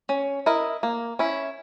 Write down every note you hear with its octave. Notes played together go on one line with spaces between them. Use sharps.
C#4
E4 A#4 D#5
A#3
C#4 E4